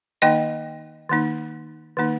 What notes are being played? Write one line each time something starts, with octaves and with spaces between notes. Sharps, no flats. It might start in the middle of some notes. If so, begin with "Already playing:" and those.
D#3 A#3 D#4 D#5 G5
D#3 A#3 D#4
D#3 A#3 D#4